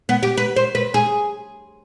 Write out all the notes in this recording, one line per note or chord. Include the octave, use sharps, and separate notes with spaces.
B3
G4
B4
C5
B4
G#4